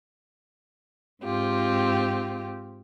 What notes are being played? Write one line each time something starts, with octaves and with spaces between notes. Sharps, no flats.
G#2 C4 F4 G4